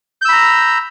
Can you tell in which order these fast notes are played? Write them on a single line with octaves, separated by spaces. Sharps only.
G6 E6 B5 A#5